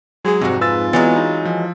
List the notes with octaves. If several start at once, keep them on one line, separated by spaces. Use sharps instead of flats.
F#3 G#3 G#4
F2 G#2 C3 F#4
F4 B4 E6 A6
E3 F#3 G#3 B3 A6
D#4
F3